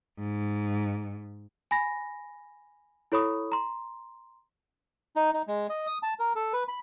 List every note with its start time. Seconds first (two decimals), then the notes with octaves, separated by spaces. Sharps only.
0.18 G#2
1.71 G#5 B5 A#6
3.12 E4 A4 C#5 B5 C#6 D#6
3.52 A#5 C6
5.16 D#4
5.34 D#4
5.47 G#3
5.69 D#5
5.87 D#6
6.03 A5
6.20 A#4
6.36 A4
6.53 B4
6.68 B5